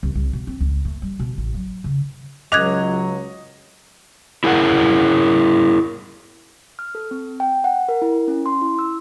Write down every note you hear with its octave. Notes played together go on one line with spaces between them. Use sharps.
C2
C2
B2
C4
C#2
A3
G3
B2
A1
F#3
C#3
C#2 F#3 D#5 D6 F#6 G#6 F7
E4 G#4 A#4 F5 F#5
F6
A4
C4
G5
F#5
A#4
E4
C#4
C6
E4
E6